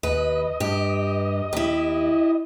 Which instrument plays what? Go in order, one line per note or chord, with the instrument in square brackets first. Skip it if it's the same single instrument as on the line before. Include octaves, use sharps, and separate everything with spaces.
[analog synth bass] D#2 [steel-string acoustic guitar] B4 [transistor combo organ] D#5
[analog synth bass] G2 [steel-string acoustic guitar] G4
[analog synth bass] D#2 [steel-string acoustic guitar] E4 G4